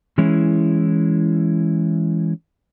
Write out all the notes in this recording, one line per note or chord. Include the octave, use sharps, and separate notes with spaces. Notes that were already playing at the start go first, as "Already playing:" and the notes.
E3 G#3 C#4 E4